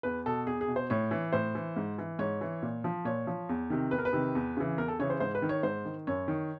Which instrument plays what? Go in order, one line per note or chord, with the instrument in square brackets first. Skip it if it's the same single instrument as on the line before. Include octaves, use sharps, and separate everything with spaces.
[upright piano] E2 B4
B2 A4
E2 G#4
G#4
B2
C5
A2 C#5
E3
A2 C5
E3
G#2
E3
G#2 C#5
E3
A#2
F3
A#2 C#5
F3
E2
C3 D#3
E2 B4
A#4
B4
C3 D#3
E2
C#3 E3
E2 A#4
A4
C#3 E3 C#5
C5
G#2 C5
B4
D#3
C#5
G#2 C5
D#3
F#2 C#5
D#3